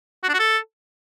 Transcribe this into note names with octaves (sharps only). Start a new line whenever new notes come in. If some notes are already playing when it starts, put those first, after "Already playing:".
F#4
D4
F#4
A4